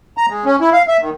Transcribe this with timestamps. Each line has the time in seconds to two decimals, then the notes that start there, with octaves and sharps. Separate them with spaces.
0.17 A#5
0.30 G#3
0.45 C#4
0.61 E4
0.73 F5
0.88 E5
1.01 D#3